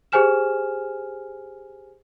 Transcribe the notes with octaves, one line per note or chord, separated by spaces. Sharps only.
G4 G#4 C5 G#5 F6 E7